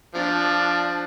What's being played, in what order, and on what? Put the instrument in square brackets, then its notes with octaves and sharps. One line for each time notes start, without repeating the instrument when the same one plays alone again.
[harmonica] F3 [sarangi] D4